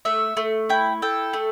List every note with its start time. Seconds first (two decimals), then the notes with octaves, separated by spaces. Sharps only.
0.05 A3 E5
0.37 A3
0.69 E4 G5
1.02 A4 G5
1.33 A3